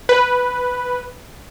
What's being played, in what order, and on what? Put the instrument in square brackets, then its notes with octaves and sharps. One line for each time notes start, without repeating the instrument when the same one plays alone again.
[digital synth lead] B4